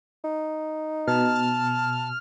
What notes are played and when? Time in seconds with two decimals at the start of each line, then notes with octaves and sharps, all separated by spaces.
0.25 D#4
1.07 B2 A5 F6